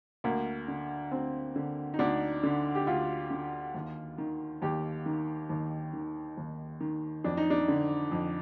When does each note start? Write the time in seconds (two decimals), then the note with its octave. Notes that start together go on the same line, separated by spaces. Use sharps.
0.24 D2 A#3
0.68 D3
1.12 D2 C4
1.56 D3
1.94 D#4
1.99 D2 D4
2.43 D3
2.75 G4
2.87 D2 F4
3.31 D3
3.74 D#2
4.18 D#3
4.62 D#2 G4
5.06 D#3
5.49 D#2
5.93 D#3
6.37 D#2
6.80 D#3
7.24 F2 D4
7.37 D#4
7.50 D4
7.68 D3
8.11 F2